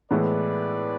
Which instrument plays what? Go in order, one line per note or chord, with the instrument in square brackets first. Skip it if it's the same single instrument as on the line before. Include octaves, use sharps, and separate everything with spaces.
[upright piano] A2 E3 G#3 B3 E4 [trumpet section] B4 D5